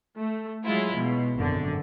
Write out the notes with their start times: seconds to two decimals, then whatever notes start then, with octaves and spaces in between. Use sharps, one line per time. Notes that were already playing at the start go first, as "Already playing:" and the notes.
0.18 A3
0.64 F#3 G#3 E4 F4
0.94 B2
1.37 G#1 F#2 D3